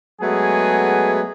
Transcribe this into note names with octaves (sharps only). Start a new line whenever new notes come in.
F#3 G#3 A3 B3 G#4 G#5